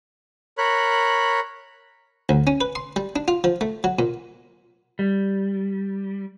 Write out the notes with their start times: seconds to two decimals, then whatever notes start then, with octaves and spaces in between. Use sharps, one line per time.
0.58 A#4 C#5 B5 F#6
2.29 D2
2.47 C#4
2.61 B4
2.75 C6
2.96 G3
3.16 D4
3.28 F4
3.44 F3
3.61 A3
3.84 F#3
3.99 A#2
4.99 G3